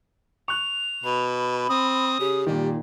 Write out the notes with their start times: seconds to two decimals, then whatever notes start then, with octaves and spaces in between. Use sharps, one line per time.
0.48 C#6 F#6 F7
1.04 B2 B5
1.69 C4 D#6
2.19 C#3 G4
2.47 A#2 D#3 G3